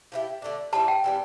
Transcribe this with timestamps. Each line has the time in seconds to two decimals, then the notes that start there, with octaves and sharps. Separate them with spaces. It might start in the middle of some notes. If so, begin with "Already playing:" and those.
0.12 F3 B3 E4 G4
0.42 D3 A3 D4
0.73 G3 C4 E4 A5
0.88 G5
1.04 E3 G3 B3